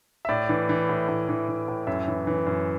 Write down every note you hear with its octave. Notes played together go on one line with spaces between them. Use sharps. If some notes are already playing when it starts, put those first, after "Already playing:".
E5
A2 D5
E3
E3
A2
A2
E3
E3
A2
F#2 E5
E3
E3
F#2